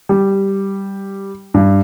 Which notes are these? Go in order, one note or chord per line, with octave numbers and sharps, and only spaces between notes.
G3
G2